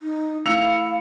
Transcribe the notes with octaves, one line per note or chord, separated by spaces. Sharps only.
D#4
A3 E4 F5 E6 C#7 F7